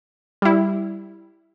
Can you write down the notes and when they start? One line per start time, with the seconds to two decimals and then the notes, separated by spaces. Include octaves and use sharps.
0.42 G3 E4